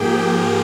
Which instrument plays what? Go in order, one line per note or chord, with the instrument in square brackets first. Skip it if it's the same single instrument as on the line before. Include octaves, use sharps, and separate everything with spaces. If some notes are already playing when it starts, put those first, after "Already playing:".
Already playing: [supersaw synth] G#2 F3 A#3 G4 G#4 G5